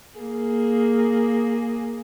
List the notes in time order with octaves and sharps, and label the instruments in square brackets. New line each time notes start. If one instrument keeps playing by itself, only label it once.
[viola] A#3 G#4